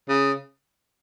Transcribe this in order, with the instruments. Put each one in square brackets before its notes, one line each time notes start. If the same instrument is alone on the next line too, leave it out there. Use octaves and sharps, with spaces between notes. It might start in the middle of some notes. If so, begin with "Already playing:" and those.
[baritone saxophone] C#3